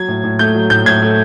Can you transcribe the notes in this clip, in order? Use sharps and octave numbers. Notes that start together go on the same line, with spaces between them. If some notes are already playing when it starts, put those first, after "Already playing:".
Already playing: F#3 G#6
A2
A2
A3 G6
F#3
A2 G6
A2 G#6
A3